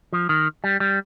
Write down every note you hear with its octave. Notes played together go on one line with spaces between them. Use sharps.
F3
D#3
G3
G3